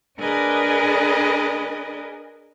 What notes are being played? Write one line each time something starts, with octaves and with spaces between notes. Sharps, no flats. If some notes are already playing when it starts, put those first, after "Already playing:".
D4 G#4 A#4 B4 D5 D#5